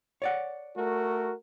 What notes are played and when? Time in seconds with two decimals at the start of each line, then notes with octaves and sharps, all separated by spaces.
0.22 C#5 D5 F#5
0.76 A3 F#4 A#4